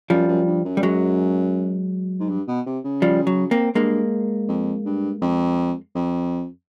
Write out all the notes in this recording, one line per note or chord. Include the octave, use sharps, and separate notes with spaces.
F#2 F3 G3
F#2
G2
F#2
G3
F#3 G#3
G#2
G2
B2
C3
C#3
F3 G3
F#3
A#3 C4
G2 G#3 A#3
F2
G2
F2
F2